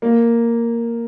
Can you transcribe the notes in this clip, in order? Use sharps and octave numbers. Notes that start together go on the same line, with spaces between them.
A#3